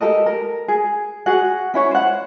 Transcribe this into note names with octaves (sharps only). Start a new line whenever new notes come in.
G4 A4 A#4 D#5
A#4
G#4
F#4 G#4 F#5
C#4 E4 C#5
C5 F#5